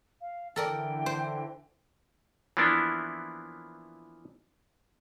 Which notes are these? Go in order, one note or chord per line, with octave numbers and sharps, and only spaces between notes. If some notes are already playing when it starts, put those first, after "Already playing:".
F5
D3 E3 A4 A#4 D5 G5
C5
E3 F3 A#3 B3 D4 E4